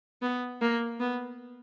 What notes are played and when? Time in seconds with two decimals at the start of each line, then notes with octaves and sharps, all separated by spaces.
0.22 B3
0.61 A#3
1.00 B3